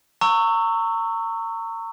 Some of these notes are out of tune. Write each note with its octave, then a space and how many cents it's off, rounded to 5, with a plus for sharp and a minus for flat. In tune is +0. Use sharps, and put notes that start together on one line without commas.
A#5 -30 C#6 +0 E6 +0